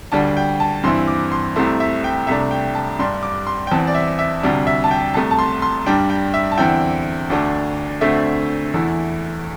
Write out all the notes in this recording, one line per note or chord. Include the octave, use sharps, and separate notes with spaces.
D2 D3 G3 A5
G5
A5
G2 E3 C4 E4 C6
D6
C6
C2 C3 A3 C4 E4 C6
E5
G5
C2 C3 A3 D4 E5
G5
A5
G2 G3 D4 C6
D6
C6
G5
E2 E3 C4 A5
D5
E5
E5
D2 C3 G3 D4
E5
A5
G5
C2 C3 A3 A5
A5
C6
C6
G2 G3 D4 G5
G5
E5
A5
E2 D3 C4 E4 G5
D2 D3 A3 D4
D2 D3 A3 C4 E5
E2 E3 A3 E4